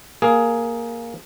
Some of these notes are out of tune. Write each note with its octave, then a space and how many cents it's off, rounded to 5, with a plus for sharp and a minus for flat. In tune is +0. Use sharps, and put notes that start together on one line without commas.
A#3 +0 G#4 +10